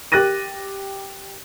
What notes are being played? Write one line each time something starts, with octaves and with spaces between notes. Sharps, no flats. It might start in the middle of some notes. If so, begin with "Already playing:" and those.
G4 F#6 A6 A#6 D#7